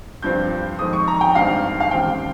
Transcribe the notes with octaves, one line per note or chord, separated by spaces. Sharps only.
G2 F3 C4 G6
F2 D#3 G#3 C4 D#6
C#6
A#5
G5
G2 D#3 G#3 C4 F5
F5
D#2 C#3 G#3 C4 G5